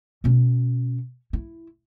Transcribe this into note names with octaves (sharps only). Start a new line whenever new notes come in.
B2 C#4
E4